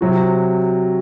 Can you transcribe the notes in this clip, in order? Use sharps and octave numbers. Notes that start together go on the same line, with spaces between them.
C3 F#3 C4 F#4